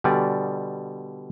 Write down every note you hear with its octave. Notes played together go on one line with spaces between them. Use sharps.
B2 D3 G3 D5 G#5